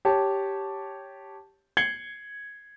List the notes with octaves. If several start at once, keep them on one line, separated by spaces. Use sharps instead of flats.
G4 C#5 A5
G#6 C7 C#7 F#7 G7